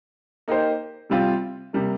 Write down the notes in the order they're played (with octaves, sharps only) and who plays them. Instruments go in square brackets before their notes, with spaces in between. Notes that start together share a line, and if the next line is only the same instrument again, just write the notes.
[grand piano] A#3 D#4 G4 C5
C3 G3 C4 F4
C3 G3 A#3